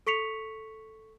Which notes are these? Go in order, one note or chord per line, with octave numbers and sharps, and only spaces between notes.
A4 C#6 B6 C#7 F7